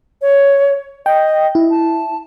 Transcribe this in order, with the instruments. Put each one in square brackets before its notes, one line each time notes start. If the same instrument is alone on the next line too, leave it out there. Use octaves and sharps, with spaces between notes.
[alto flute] C#5
[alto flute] D#5 [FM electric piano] G5
[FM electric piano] E4
[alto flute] A5